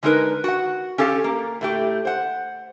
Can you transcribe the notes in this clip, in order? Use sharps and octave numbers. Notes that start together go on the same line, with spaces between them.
D3 G#3 D#4 G4 A#4 B4
F#4 F#5
C#4 G4 A4 F5
A#3
A2 A3 G4
C5 F#5